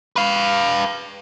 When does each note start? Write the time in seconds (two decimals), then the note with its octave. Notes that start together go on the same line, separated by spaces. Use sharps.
0.16 B4 F5